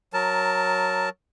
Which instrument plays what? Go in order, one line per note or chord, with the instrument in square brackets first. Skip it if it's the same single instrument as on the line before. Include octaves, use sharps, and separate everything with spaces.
[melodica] F#3 A#4 A5